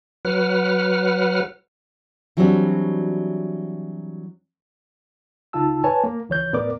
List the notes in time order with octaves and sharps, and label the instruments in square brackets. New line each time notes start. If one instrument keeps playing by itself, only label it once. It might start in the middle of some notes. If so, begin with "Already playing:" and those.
[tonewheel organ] F#3 B4 F#5 F6
[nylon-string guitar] E3 F#3 G3 C4 D4 F#4
[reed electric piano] C#2 C#3 D#4 F4 A5 E6
B4 C#5 G#5 A5
A#3
C#2 E3 C#5 G6
A2 B3 A#4 D5 D6